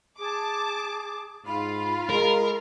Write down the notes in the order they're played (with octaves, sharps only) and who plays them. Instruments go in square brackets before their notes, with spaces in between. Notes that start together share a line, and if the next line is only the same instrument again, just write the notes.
[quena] G#4 [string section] A5 D6
[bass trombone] G#2 [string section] F4 [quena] B5
[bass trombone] G#3 [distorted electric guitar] A#4